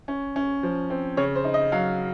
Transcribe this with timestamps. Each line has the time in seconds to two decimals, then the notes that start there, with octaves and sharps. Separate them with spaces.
0.08 C#4
0.36 C#4
0.63 F3
0.90 C4
1.17 C#3 C#5
1.36 C5
1.44 D#4
1.54 D#5
1.72 F#3 F5